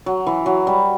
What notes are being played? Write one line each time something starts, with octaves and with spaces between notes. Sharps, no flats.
F#3
E3
F#3
G3